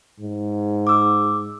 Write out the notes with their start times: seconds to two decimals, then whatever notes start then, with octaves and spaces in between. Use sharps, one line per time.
0.20 G#2
0.87 D6 E6